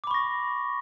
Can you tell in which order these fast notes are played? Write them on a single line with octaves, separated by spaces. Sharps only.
D6 B5 C#6 A#6